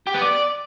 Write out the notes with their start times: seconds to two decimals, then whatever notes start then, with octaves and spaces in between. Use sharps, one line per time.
0.07 G4
0.14 B3
0.22 D5